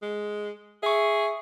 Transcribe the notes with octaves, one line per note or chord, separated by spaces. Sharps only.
G#3
G#4 E5 C#6